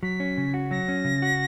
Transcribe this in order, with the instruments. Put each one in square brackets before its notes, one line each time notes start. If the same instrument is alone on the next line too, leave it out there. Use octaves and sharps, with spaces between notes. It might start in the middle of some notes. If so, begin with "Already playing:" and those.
[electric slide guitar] F#3 [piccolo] B6
[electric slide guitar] C#4
C#3
F#4
[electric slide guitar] F#3 [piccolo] A#6
[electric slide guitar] C#4
C#3
F#4